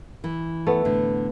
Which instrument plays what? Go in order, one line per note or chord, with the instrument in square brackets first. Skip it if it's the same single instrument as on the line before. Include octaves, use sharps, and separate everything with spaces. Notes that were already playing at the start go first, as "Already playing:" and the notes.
[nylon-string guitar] E3
[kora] A3 B3
[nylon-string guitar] A2 D3